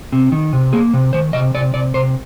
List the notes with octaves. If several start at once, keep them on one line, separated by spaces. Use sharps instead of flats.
C3
D#3
C3
A#3 G#4
C3
D#3 C5
C3 D#5
C3 D5
C3 D5
C3 C5